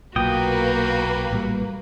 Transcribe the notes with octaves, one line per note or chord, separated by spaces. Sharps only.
B1 A#2 A#3 F#4 B4 G5 D#6
A1 A#2 G3